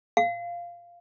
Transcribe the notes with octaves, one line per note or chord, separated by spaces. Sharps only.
F5